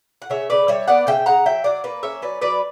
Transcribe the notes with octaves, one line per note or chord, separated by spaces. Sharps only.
F#5
C#3 C#5 E5
C#3 B4 D5
G3 C#5 E5
B3 D5 F#5
C#3 E5 G5
C#3 F#5 A#5
F#3 E5 G5
F#3 D5 F#5
A#3 B4 D5
C#4 C#5 E5
F#3 B4 D5
F#3 B4 D5